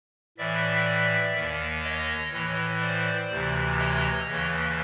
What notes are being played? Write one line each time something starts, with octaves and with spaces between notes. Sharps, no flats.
A2 E3 D5 E5
D#2 D#3
C#5 D#5
A2 E3
C5 D5
D2 C3 E3
C#5 D#5
D#2 C#3 E3